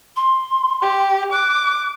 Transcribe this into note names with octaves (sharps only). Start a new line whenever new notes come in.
C6
G4
D6 F#6